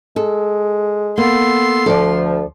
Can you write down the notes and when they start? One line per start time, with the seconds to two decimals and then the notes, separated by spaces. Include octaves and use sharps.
0.16 G#3 A4
1.18 A#3 B3 A4 C6
1.86 D2 F3 A4 D5